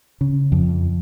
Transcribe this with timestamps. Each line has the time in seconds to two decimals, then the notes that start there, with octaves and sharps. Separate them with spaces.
0.21 C#3
0.52 F2